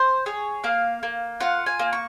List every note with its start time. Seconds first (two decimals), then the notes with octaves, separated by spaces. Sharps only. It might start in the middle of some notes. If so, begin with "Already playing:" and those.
Already playing: C5
0.26 G#4 C#5
0.64 A#3 F5
1.03 A#3
1.40 F4 F#5
1.66 G#5
1.79 A#3
1.93 C#6